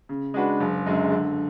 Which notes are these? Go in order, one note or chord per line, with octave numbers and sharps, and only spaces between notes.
C#3
G#3 D4 F#4 B4
F#1
F#2 D3 G#3
D3